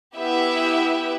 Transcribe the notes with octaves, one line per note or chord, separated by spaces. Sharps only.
B3 E4 G4 B4 E5